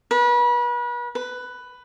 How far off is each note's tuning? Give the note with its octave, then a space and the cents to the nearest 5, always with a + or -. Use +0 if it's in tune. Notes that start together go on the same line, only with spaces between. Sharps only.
B4 -35
B4 +10